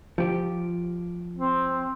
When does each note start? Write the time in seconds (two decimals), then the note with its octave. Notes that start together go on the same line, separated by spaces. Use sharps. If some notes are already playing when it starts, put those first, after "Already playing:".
0.18 F3 G4
1.36 C4